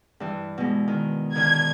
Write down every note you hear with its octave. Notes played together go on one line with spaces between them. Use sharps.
G2 E3
B2 G#3
D#3
D3 D#3 G#6